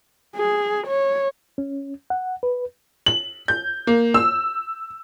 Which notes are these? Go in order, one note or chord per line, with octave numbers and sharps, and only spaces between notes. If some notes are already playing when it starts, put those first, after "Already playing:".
G#4
C#5
C#4
F#5
B4
F#7
G6
A#3
E6